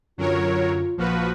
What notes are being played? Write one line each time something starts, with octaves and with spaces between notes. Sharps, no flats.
F#2 D3 F#3 C#4 F4 A#4 C#5
A#1 F3 A#3 F#4 B4 F6